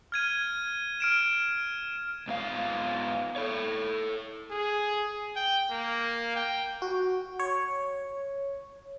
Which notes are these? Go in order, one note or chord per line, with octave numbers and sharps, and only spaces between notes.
F6 G#6 D#7
F6 D7 E7
G#2 B3 F5
A4 C#5
G#4
G5
A#3
G5
F#4
C#5